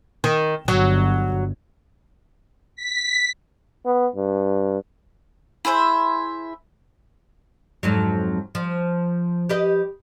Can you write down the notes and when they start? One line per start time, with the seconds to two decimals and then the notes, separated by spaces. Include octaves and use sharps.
0.24 D#3
0.68 G1 F#3
2.76 B6
3.86 B3
4.16 G2
5.65 E4 G#4 C5 E5
7.83 F2 G#2 F#3
8.55 F3
9.49 G4 B4 D#5